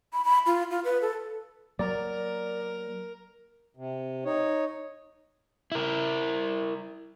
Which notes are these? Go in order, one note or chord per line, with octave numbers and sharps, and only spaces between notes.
B5
B5
F4
F4
B4
A4
F#3 A#3 A#4 D5
C3
D#4 C#5
E4 A#4